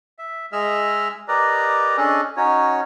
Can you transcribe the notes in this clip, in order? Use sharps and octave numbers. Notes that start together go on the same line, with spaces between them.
E5
G#3 G#4 D#5 E5 E6 F6
G4 A#4 B4 D5 D#5 A#5
C#4 D4 G#4 A4 D#5
C#4 D#4 F#4 C#5